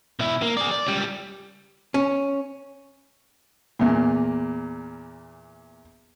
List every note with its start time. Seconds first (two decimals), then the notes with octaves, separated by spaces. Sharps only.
0.19 B2 E4
0.42 A#3
0.57 G#4 D5
0.71 D5
0.87 C#2 G3
1.94 C#4
3.79 E2 A#2